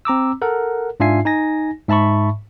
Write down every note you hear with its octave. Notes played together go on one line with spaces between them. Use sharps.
C4 A#5 D6 E6
A4 A#4 F#5
G#2 D4 F4 E5 G#5 C7
D#4 G#5 A#6
G#2 E5 A5 B5 C#6